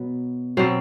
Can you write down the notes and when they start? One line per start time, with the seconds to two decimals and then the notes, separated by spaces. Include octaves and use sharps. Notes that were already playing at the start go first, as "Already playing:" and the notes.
Already playing: B2 F#3 B3
0.57 B2 F#3 C4